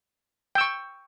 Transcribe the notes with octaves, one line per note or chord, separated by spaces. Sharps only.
G5 C#6 E6